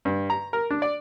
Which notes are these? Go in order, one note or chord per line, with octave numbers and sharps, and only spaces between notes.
G2
A#5
A#4
D4
D5